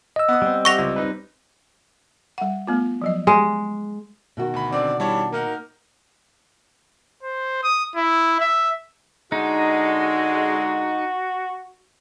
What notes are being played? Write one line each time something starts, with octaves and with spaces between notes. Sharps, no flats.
D#5 E6
B3 D#6
G3 C4
G4 E5 F#5 C#6 A#6 F7
C#2
D#4 B4
G3 F#5
A3 B3 F4
F3 F#3 D#5
G#3
B2 D#3 F#4
D2 B5
D3 C4 D5
G3 D4 E4 C#5
A#3 D#4 A#4 F#5
C5
D#6
E4
E5
D3 G#3 D#4 F#4